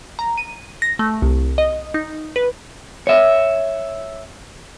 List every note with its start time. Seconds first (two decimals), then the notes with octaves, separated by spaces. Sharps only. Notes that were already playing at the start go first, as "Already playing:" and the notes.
0.19 A#5
0.38 D#7
0.82 A#6
0.99 A3
1.22 C2
1.58 D#5
1.94 D#4
2.36 B4
3.07 C#5 E5